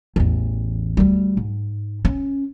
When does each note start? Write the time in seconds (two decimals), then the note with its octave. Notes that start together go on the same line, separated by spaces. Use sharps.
0.16 A1 E2
0.97 D2 G3
1.37 G#2
2.05 C#4